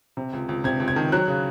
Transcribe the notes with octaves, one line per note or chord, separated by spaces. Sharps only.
C3
C#2
C#2
C3 G#6
C#2
G#6
D#3
F#3 F#6
C#3